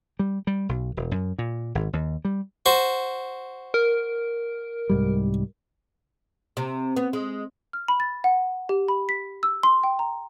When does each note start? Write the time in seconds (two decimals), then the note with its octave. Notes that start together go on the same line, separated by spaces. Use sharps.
0.19 G3
0.47 G3
0.69 B1
0.97 E1
1.11 F#2
1.38 A#2
1.75 G#1
1.93 D#2
2.25 G3
2.66 F#4 C5
3.74 A#4
4.90 C2 G#2 G3
6.57 C3
6.97 B3
7.13 G#3
7.73 F6
7.88 B5
8.00 A6
8.24 F#5
8.69 G4
8.88 B5
9.09 B6
9.43 E6
9.63 C6
9.84 G5
9.99 A#5